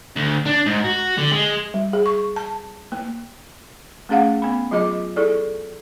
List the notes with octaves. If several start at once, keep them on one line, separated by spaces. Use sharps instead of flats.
D2
D4
G#2
F#4
D3
G#3
G3
G#4
C#6
A5
A#3
A3 C#4 G#4 F5 F#5
B3 B5
F#3 F4 G#4 D#5 D6
E4 G#4 A4 D5